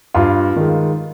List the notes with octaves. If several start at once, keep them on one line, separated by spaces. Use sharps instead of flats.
G2 F4
D#3 G#3